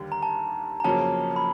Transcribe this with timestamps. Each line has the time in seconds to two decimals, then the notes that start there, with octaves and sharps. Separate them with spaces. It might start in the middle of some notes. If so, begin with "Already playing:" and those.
Already playing: D#2 D3 G3
0.12 A#5
0.23 A5
0.80 A#5
0.84 F2 C#3 F#3 A#3 C#4 A5
1.36 B5